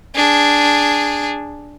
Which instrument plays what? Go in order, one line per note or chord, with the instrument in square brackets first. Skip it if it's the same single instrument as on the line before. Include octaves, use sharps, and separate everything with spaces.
[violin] D4 G#4